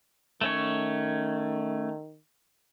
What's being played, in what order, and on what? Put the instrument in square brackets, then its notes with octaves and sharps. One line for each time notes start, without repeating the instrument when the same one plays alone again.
[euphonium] D#3 [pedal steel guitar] A3 C#4 C#5